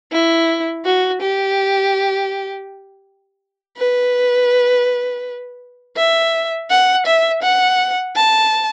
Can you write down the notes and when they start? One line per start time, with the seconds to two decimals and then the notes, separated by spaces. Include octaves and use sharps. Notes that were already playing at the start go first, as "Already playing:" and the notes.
0.12 E4
0.85 F#4
1.21 G4
3.77 B4
5.97 E5
6.70 F#5
7.06 E5
7.43 F#5
8.16 A5